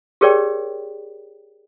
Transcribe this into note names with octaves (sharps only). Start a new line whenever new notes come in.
G4 G#4 A#4 C#5 D5 G5